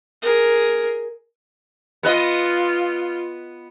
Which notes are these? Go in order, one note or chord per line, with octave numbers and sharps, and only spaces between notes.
G#4 A#4
B3 F4 B4 D#5